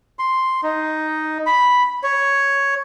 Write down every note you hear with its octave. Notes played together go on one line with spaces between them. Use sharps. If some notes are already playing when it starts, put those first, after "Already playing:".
C6
D#4
B5
C#5